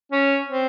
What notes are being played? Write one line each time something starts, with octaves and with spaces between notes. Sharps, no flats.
C#4
C4